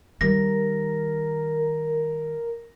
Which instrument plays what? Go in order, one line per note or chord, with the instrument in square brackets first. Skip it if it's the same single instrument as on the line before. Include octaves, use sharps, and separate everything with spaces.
[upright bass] D#3 G3 [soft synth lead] A#4 [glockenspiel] A#6